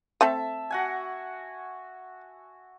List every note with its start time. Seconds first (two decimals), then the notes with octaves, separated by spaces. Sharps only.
0.21 A3 C4 A4 E5 A5
0.70 F#4 F#5 G#5